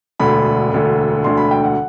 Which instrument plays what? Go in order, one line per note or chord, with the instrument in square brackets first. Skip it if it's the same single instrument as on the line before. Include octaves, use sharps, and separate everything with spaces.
[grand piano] E1 D2 D3 B5
E1 D2 D3
E1 D2 D3 C6
B5
G5
F#5